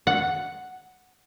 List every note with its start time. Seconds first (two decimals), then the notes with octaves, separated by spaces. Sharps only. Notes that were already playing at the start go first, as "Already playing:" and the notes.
0.07 F#5